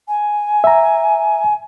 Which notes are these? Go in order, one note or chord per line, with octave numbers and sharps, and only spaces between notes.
G#5
E5 A#5